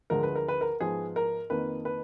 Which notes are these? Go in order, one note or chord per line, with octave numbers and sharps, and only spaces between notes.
D2 D3 F3 G#3 A#4
B4
A#4
B4
A#4
G#2 F3 B3 G#4
A#4
F2 D#3 A#3 B4
B4